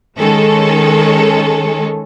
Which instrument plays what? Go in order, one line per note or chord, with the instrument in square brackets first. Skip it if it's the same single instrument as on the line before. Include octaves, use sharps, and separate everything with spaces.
[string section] D#3 G#3 C#4 A4